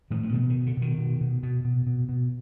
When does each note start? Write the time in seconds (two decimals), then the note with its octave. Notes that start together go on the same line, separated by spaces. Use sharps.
0.11 A2 D#3 F3
0.23 F3
0.33 B2 D3 E3
0.50 D#3
0.55 B2
0.66 D3
0.77 B2 D#3
0.98 B2
1.21 B2
1.43 B2
1.65 B2
1.87 B2
2.09 B2